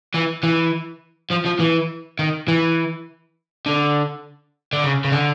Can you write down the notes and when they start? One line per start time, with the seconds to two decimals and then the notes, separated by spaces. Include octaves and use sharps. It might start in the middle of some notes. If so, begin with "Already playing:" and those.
0.14 E3
0.43 E3
1.31 F3
1.46 F3
1.60 E3
2.19 D#3
2.48 E3
3.66 D3
4.73 D3
4.84 C#3
5.05 C#3
5.12 D3